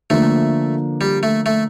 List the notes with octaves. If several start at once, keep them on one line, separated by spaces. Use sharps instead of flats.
D3 F3 A3 A#3 D4
G3
A3
A3